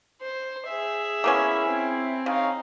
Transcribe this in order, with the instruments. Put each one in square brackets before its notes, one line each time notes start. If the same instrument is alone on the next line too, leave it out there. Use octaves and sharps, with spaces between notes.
[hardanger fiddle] C5
G#4 E5
[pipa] A#3 B3 C#4 [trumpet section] E4
[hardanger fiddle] C4
[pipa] C#3 [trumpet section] D#4 C#5 F5